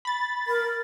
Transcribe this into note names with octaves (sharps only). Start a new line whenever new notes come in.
B5 A6
A#4